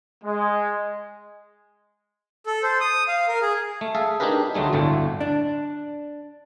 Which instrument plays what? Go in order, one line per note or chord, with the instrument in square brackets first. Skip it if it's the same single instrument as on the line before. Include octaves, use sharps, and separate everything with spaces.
[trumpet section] G#3
[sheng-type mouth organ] A4
C5
D#6
F5
A#4
G#4
[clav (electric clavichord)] A3
G#4 A4 E5 F5
D4 D#4 G4 G#4 A#4 B4
D2 F#3 G3 A3 G#4
G1 D2 A2 A3
[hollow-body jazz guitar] D4